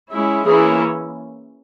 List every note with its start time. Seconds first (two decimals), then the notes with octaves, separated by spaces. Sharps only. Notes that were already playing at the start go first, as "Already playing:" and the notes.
0.11 G#3 C#4 E4
0.45 E3 A#3 C#4 E4 G#4